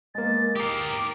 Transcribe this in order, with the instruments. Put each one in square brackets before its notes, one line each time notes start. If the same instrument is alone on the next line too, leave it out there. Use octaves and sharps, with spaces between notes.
[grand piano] G#3 A#3 [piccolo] A6
[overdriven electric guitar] G4 A#4 [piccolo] D6 [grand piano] D#6 C7